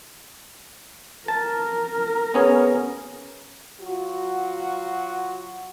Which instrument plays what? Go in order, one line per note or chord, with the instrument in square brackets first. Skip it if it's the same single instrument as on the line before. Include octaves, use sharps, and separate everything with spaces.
[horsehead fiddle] A#4 [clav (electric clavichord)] A5
[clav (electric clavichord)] B3 C#4 G#4
[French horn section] F#3 F4 F#4